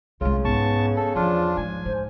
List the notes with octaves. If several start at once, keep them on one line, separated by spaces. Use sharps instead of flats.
C2 C#3 G#3 F4
G#2 B3 A5 C#6
A4
E2 F3 D4 F4
G#2 G#5
G#2 C5